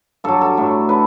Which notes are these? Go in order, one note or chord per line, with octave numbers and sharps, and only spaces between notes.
G2 F#3 A4
A4
A2 F#3
D3 B4